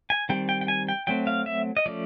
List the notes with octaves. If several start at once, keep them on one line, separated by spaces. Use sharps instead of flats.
G#5
D#3 G3 C4 G5
G5
G5
G#5
G5
F#3 A3 C4 G5
F5
E5
D#5
F3 A3 C#4 D5